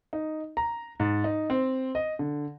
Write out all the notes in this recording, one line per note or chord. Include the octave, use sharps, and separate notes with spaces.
D#4
A#5
G#2
D#4
C4
D#5
D3